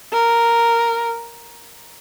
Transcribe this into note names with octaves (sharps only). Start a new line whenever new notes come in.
A#4